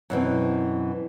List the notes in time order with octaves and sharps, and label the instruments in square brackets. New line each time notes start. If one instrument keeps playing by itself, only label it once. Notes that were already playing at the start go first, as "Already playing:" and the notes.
[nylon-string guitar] F#2 B2 E3 C4